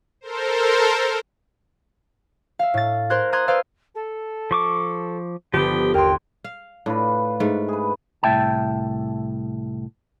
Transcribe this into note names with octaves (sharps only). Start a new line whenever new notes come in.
A4 A#4 C5
E5 F5
A2 A6
A#4 C5 C6 F#6 G#6
A#5 C6 D#6 F#6 G#6
B4 C5 D5 F5 E6 F6
A4
F3 C#6 D6
G1 F3 B3 G4
D#2 A#4 G5 C6
F5
A2 D4 F4 B4
G#2 A3
G#4 B4
C2 A2 E5 G5 A5